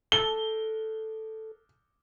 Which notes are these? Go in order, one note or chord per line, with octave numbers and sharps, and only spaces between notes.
A4 G7